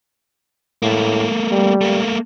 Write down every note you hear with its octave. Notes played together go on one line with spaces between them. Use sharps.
A2 A3 A#3
G3
A3 A#3